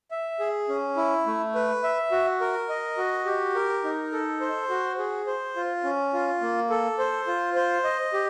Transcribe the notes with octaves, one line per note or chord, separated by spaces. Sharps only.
E5
G#4
C#4
E4
A3
B4
E5
F#4
A#4
D#5
F#4
G4
A#4
D#4
A4
C5
F#4
G#4
C5
F4
C#4
F4
A#3
A4
C5
F4
C5
D#5
G4